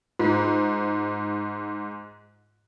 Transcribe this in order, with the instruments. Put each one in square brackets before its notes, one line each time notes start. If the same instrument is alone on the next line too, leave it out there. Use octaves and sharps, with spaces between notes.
[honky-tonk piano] G#2 [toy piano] F4